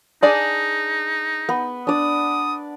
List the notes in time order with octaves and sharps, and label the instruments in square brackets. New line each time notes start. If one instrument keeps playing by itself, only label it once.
[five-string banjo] D4 G#4 D5 [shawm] D#4
[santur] B3
[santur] D4 D5 [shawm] D#6